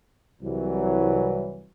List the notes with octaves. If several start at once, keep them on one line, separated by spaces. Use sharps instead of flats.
C2 E3 F#3